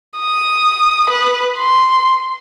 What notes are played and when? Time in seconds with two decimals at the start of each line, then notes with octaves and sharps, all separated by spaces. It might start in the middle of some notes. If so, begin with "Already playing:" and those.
0.19 D#6
1.10 B4
1.58 C6